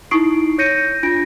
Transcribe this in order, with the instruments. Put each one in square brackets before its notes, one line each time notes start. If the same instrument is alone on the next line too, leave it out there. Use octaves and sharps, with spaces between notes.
[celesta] D#4 E4 C#6 D#6 C7 D7
C#5 G6 A#6 C#7 D#7
D4 F4 A#6 D7